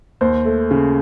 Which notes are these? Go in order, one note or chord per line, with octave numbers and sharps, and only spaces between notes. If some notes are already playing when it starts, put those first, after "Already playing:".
D#2 C5
A3
C#3